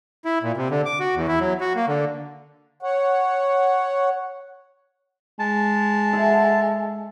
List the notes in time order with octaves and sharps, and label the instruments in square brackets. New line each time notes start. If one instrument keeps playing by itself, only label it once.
[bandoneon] E4
A#2
C3
D3
D6
F#4
E2
E4
F#3
F#4
A#3
D3
[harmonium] C#5 F#5
[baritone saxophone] G#3 [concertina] A5
[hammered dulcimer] A4 E5 F#5